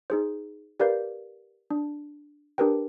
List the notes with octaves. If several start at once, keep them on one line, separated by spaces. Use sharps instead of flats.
D#4 G#4 C5
G4 A#4 B4 D5 F5 G6
D4
D4 G4 A#4 B4 G5